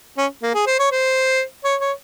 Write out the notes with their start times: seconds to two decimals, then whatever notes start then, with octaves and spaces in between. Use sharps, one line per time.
0.17 C#4
0.42 A#3
0.54 G#4
0.66 C5
0.79 C#5
0.91 C5
1.64 C#5
1.81 C#5